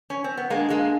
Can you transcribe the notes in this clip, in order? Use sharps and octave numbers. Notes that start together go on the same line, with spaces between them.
C#4
C4
B3
G#3 A#3 D4
G#3 A#3